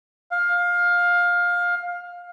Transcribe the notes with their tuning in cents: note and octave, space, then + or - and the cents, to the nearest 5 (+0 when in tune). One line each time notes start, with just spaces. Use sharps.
F5 +15